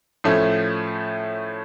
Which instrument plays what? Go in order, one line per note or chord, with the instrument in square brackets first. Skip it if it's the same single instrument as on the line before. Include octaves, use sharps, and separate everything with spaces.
[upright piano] A2 F3 A3 C#4